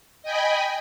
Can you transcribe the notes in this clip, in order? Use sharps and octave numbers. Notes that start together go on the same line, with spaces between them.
D#5 G5 G#5 B5